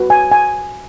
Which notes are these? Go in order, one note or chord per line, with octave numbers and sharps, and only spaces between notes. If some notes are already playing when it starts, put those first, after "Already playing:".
Already playing: F#4 B4
G#5
G#5